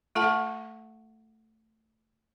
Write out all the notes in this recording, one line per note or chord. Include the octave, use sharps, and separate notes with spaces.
A3 F4 A4 F#5 A5